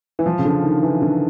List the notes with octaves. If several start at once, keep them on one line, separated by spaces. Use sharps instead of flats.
E3
F3
C#3
D3
D#3
E3
D3